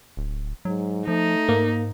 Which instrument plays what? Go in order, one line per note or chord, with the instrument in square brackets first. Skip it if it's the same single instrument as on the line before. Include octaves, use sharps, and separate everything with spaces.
[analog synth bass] D1
[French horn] G#2 [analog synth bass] F#3
[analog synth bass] F3 [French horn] A3 [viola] D#4
[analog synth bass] G#2 [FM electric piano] A#3